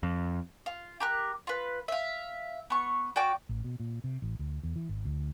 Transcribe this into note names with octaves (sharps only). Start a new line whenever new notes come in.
F2
F4
G4 A#4 F#6
F4 B4
E5 F5
B3 C#6
F#4 D5 G5 D6
A1
B2
A#2
C3
A1
D2
E2
E3
G#1
D2